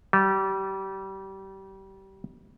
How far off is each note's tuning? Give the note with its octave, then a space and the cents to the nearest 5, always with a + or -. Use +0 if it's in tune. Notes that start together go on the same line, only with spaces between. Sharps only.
G3 -25